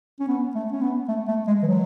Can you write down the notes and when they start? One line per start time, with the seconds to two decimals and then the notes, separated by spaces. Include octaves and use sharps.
0.20 C#4
0.28 B3
0.55 A3
0.72 C#4
0.81 B3
1.08 A3
1.28 A3
1.47 G#3
1.63 E3
1.67 F#3